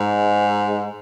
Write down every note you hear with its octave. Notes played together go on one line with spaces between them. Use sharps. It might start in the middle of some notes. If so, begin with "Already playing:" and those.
Already playing: G#2